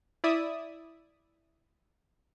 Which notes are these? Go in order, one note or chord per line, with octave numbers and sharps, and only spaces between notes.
E4 D5 E5 D#6